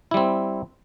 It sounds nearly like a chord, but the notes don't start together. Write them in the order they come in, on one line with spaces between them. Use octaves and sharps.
E4 G3 C4